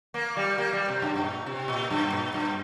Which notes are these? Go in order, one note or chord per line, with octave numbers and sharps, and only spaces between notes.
A#3
G3
A#3
G3
C3
G2
G2
A#2
C3
A#2
G2
A#2
G2